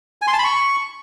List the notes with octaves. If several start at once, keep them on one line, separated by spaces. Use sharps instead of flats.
G#5
C6
A5
B5
C#6